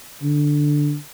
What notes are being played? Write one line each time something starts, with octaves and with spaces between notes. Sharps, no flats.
D3